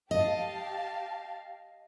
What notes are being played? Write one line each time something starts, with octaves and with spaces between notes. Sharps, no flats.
G4 D#5 F5 A5